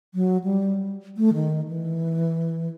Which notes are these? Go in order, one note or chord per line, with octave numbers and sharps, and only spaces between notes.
F#3
G3
A3
D#3
E3